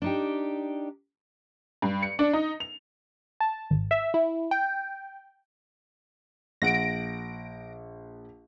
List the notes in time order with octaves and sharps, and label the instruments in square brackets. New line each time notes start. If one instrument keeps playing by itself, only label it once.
[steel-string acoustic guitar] D4 D#4 G4
[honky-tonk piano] G2
C#7
D4
D#4
F7
[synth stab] A5
G#1
E5
E4
G5
[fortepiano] A#1 F#5 [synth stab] A#6 D7